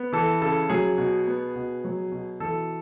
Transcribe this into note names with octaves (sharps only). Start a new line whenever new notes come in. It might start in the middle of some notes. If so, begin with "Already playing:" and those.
Already playing: B3
E3 A4
C#3 A4
F#3 G#4
B2
B3
B2
F#3
B2
E3 A4